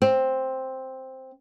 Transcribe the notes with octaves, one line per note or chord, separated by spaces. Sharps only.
C4